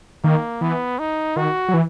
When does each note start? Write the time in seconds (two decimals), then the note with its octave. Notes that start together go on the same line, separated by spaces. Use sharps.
0.24 D#3 A#3
0.61 E3 B3
0.99 D#4
1.36 D#3 F#4
1.68 F#3
1.74 E3